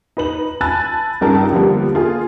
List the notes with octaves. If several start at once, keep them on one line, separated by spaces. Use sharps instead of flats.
D#4 B4 F#7
G#5 A5 B5 E6 F#6 A6
C#2 G2 G#3 D#4 A#4 A5
D3 F3 G3 A#3 B3
A#3 F4 G#4